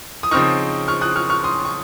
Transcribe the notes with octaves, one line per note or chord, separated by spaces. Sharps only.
D#6
C#3 F3 C4 D#4 C#6 F6
C#6 F6
D#6 F#6
C#6 F6
C#6 F6
C6 D#6
C#6